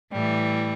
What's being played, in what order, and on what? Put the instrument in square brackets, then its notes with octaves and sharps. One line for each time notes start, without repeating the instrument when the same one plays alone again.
[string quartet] A2 E3 G3